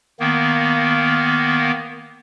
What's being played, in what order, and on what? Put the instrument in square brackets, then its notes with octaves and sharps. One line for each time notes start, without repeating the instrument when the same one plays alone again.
[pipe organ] D#3 A#3 B3